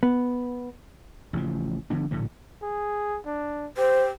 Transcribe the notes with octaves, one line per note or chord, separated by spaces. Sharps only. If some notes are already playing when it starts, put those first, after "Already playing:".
B3
A1 C#3 E3 F3
D3 F3 B3 D4
A#1 A2 D3 A3
G#4
D4
G4 C5